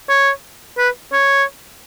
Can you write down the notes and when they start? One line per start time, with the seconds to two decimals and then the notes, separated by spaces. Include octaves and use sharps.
0.09 C#5
0.78 B4
1.13 C#5